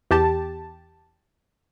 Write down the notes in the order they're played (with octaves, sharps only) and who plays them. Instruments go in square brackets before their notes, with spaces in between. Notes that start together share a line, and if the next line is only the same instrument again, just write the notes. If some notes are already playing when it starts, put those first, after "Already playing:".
[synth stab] E2 G4 A5